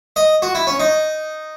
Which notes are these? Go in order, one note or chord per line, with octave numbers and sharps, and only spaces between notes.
D#5
F#4
E4
C#4
D#4